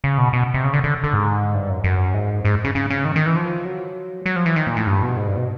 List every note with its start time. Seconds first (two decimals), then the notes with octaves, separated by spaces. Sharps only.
0.04 C#3
0.18 B2
0.33 B2
0.54 C3
0.64 C#3
0.73 D3
0.84 D3
1.04 D3
1.13 G#2
1.54 G2
1.69 F#2
1.84 F#2
2.14 G#2
2.45 G#2
2.64 C#3
2.75 C#3
2.90 C#3
3.05 D#3
3.16 D#3
3.26 E3
3.36 F3
3.65 F#3
4.26 F#3
4.36 F3
4.46 E3
4.56 D#3
4.67 A#2
4.76 A2
4.87 G2
5.02 B2
5.17 G#2
5.27 G2
5.37 B2